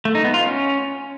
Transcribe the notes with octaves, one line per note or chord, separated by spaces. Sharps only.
A3
D#4
B3
F4
C#4